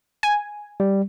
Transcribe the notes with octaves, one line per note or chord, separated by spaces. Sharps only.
G#5
G3